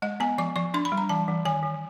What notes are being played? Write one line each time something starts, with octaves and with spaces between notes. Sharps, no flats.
G#3 D#5
B3 G#5
F3 D6
F3 C#6
D4 C6
B5
G3
A#5
E3 A5
E3
D#3 G#5
D#3